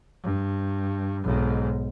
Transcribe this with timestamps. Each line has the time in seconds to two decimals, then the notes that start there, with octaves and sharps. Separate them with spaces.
0.24 G2
1.24 B1 G#2